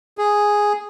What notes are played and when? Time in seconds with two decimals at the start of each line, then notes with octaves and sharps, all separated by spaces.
0.18 G#4